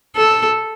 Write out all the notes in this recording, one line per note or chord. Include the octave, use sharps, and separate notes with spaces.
A4